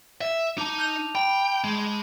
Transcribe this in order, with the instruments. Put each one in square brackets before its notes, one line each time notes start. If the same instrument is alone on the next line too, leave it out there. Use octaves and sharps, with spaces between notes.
[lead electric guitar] E5
[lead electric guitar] D#4 [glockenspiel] A5 D6
[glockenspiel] F6 G6 F7
[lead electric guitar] G5 [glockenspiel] B5
[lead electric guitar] G#3